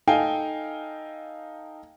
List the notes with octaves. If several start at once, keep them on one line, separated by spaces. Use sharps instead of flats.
D#4 A4 F5 G5 G#5